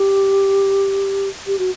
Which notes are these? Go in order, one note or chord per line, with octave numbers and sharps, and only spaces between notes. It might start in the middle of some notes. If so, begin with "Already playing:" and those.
Already playing: G4
G4
F#4